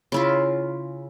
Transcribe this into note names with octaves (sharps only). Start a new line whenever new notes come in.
C#3 E4 F4